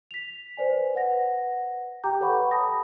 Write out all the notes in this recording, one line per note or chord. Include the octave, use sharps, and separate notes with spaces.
B6 F7
B4 C5 D5 G#5
B4 F#5 A#6
G4 G5 A#5 D6 G6
A4 B4 C#5 F#5 B5 C#6
A5 B5 D#6 A#6